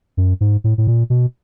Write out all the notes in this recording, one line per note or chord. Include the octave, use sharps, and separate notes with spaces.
F#2
G#2
A2
A2
A#2
B2